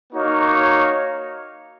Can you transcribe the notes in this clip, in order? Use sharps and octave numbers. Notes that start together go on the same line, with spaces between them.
A#3 D#4 F#4 C#5 F5